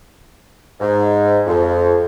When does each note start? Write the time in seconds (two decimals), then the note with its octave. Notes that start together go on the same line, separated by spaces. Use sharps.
0.79 G#2
1.47 F2